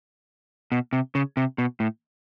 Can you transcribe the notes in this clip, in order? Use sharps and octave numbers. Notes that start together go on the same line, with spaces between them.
B2
C3
C#3
C3
B2
A2